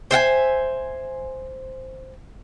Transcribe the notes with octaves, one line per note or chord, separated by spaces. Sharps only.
C5 E5 F#5 G#5